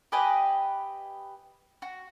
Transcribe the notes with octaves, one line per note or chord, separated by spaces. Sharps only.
G4 B4 D#5 G#5
F#4